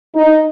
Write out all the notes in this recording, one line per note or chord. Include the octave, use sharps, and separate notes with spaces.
D#4